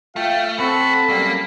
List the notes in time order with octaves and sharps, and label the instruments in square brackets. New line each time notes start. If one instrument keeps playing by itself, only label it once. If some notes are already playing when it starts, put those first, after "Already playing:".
[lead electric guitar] A3 [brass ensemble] F4 F5 G5
[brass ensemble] C4 A4 [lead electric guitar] F#4 [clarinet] B5
[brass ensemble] F#2 G3 [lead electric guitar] A#3